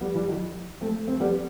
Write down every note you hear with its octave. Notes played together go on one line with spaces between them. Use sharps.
G3 B3
E3 G3
D#3 F#3
A3 C4
A3 C4
G3 B3